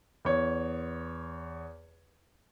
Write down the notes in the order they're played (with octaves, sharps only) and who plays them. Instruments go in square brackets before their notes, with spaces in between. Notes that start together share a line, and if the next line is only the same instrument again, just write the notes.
[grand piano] E2 C#5